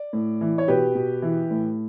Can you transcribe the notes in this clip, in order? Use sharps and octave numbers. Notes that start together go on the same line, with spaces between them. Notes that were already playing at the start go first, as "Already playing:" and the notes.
Already playing: D5
A2
E3
C#5
B2 G4 B4
B2
E3
A2